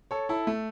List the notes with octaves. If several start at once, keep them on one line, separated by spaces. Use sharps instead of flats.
A4 C#5
E4 A4
A3